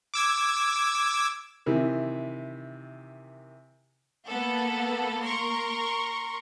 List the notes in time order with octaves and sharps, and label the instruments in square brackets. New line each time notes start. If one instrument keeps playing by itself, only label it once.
[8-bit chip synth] D6 E6 G#6
[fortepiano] C3 D#3 E3
[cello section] A#3 [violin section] B3 A4
[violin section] A#4 C6 C#6